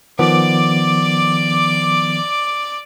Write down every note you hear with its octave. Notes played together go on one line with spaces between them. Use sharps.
D#3 F3 B3 D5 D6